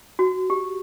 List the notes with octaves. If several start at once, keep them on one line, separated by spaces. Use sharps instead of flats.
F#4
G4